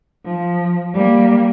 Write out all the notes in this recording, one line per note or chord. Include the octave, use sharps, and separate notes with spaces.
F3
G3 A#3